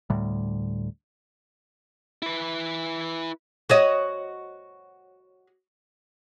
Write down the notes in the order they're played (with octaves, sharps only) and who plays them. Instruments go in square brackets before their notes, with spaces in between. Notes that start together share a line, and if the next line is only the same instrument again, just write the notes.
[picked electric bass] D2 A2 G3
[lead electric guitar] E4 B4
[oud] F#4 C#5 D#5